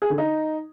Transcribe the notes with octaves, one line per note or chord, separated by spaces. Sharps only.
G#4
D3
D#4